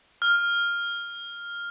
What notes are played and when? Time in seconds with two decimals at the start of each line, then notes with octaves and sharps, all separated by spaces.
0.22 F6